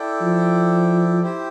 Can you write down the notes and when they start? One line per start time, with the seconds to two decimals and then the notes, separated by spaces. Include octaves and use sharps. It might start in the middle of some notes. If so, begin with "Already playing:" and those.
Already playing: E4 A4 D5 G5
0.21 F3
1.22 E4 G4 C5 G5